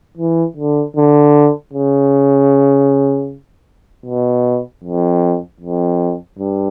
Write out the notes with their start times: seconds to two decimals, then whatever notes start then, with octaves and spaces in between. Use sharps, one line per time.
0.18 E3
0.56 D3
0.96 D3
1.73 C#3
4.06 B2
4.84 F2
5.60 F2
6.39 G2